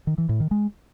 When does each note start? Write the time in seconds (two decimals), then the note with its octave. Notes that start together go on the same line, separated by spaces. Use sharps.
0.07 D#3
0.18 E3
0.29 A2
0.40 D#3
0.51 G#3